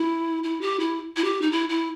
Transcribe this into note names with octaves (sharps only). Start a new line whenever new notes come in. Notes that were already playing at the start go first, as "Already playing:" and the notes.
Already playing: E4
E4
G4
E4
E4
G4
D#4
E4
E4